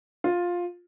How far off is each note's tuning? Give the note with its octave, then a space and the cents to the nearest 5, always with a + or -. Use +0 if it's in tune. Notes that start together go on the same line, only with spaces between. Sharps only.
F4 +10